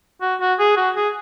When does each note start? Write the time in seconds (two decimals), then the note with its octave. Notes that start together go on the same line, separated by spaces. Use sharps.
0.21 F#4
0.41 F#4
0.59 G#4
0.77 F#4
0.95 G#4